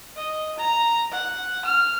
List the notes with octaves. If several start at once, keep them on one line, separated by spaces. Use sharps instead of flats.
D#5
A#5
F#5
F6